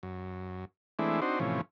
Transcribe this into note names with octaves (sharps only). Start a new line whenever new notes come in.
F#2
E3 G#3 A3 C4 D4 E4
C4 D4 D#4 F#4 C5
A2 C3 E3 F3 C#4